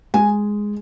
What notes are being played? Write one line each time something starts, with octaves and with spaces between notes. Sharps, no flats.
G#3 G#5